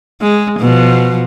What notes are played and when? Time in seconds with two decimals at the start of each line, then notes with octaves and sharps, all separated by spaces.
0.21 G#3
0.59 B2 F3